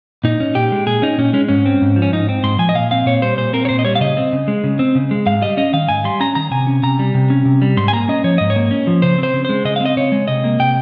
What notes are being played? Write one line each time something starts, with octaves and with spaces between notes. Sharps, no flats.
A#2 D#4
C#4
A#2 G4
G#3
A#2 G#4
C#4 D#4
A#2 C#4
G#3 C#4
G#2 C#4
C4
G#2
F3
C#4
G#2 D#4
C4
G#2 C6
F3 G#5
D#5
A#2 F5
C4 F5
A#2 C#5
G3 C5
A#2 C5
C4 A#4
C#5
A#2 C5
D#5
G3 C#5
F5
C#3 D#5
C4
C#3
G#3
C#3
C4
C#3
G#3
G#2 F5
G3 D#5
C#4 D#5
D#3 F5
G#2 G#5
G3 C6
C#4 A#5
D#3 A#5
C3 G#5
C#4
C3 A#5
G3
C3
C#4
C3
G3
G#2 C6
G#5
A#3 A#5
C#4 D#5
F3 C#5
G#2 D#5
C#5
A#3
C#4
F3
C#3 C5
C4 C5
C#3
G#3 C5
C#3 D#5
F5
C4 D#5
C#3 C#5
G#3
C3 D#5
A#3
C3 G5